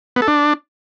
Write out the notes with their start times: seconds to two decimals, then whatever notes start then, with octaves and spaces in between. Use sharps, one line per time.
0.16 B3
0.22 A4
0.28 D4